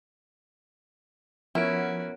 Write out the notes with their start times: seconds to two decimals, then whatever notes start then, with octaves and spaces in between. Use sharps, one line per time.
1.55 F3 B3 C#4 E4 F#4 A#4 D7